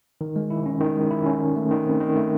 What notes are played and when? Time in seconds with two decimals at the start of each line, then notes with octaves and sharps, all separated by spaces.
0.21 D#3
0.36 G#3
0.50 E4
0.66 C#4
0.80 D#3
0.96 G#3
1.10 E4
1.26 C#4
1.40 D#3
1.56 A3
1.71 D#3
1.86 C4
2.00 D#3
2.16 A3